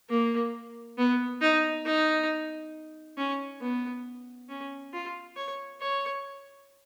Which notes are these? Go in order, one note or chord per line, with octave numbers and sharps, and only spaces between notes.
A#3
B3
D#4
D#4
C#4
B3
C#4
F4
C#5
C#5